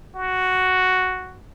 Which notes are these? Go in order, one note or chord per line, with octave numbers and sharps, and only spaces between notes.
F#4